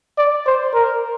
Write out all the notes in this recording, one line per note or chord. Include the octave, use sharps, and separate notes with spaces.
D5
C5
A#4